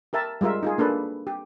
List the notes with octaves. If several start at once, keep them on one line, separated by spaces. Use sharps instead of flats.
G4 A#4 E5 A5
G3 G#3 F4 A#4 E5
D#4 F4 G#4
A#3 D4 A4 B4
G4